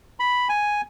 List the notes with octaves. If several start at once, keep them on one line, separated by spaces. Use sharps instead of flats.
B5
G#5